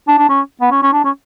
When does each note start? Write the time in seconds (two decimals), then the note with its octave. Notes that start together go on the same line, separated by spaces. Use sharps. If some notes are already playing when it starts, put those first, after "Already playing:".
0.08 D4
0.19 D4
0.29 C#4
0.61 B3
0.71 C#4
0.83 C#4
0.93 D4
1.04 C#4